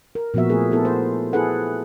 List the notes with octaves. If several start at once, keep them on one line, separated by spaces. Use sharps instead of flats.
A#4
A#2 F3 B3 F#4 E5
A3 C4 G#4 A#4
B3 E4 A4
C5
E4 G#4 A4 B4 F#5